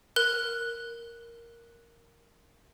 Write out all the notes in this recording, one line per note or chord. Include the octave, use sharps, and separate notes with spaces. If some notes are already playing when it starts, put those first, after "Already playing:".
A#4 F#6